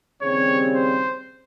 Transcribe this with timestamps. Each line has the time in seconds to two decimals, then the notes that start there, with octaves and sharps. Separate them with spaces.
0.21 D#2 C#3 G3 C4 C#5
0.75 C5